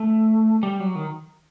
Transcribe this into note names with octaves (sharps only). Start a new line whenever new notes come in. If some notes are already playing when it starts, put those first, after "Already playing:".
Already playing: A3
G3
F#3
D#3